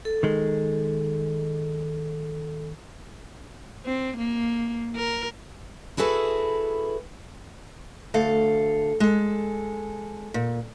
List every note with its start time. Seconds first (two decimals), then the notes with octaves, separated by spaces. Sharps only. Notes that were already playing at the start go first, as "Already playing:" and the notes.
0.05 A4
0.23 D#3 G#3
3.86 C4
4.18 A#3
4.96 A#4
5.97 E4 F#4 G#4 A4 B4
8.14 D2 A4 F5
9.00 G#3 A4
10.34 A#2